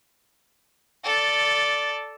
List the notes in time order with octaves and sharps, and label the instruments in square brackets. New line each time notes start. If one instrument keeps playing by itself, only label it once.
[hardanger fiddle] A4 D5